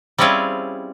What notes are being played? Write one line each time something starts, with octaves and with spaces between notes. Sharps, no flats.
G3 C4 C#4 E4 F4 G#4